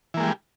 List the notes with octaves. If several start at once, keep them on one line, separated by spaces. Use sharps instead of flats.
E3 G3 G#3 A#3